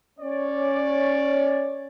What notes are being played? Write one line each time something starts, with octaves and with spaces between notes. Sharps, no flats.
C#4 C#5 D5